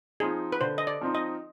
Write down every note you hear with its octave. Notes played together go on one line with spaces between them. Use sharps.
F3 C4 D#4 G#4
B4
D3 C5
D#5
D5
F3 C4 D#4
D#5